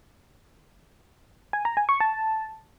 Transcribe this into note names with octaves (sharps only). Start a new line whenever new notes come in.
G#5
A#5
G#5
C#6
A5